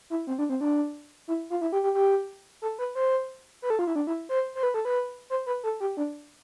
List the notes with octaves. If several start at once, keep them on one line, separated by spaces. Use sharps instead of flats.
E4
C4
D4
C4
D4
E4
F4
E4
G4
G4
G4
A4
B4
C5
B4
A4
F4
E4
D4
E4
C5
C5
B4
A4
B4
C5
B4
A4
G4
D4